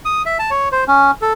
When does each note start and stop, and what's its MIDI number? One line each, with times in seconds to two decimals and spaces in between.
0.05 0.22 87
0.26 0.38 76
0.39 0.50 81
0.51 0.69 73
0.72 0.84 72
0.88 1.11 61
1.22 1.33 69